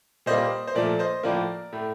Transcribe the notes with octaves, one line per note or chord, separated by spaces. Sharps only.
A#2 G3 A#3 C5 D#5
C5
A#2 F3 A3 A#4 D5
C5 D#5
A2 F3 A#3 A#4 D5
A2 A3